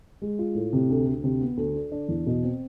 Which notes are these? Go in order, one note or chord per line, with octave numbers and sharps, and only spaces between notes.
G#3
F4
A2
C3
D2
D2
C3
B3
D2
D3
D4
E2
B2
C4